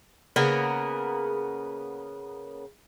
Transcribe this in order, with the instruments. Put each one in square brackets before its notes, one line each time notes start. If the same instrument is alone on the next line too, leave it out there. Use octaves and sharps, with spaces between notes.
[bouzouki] C#3 A#3 B3 A#4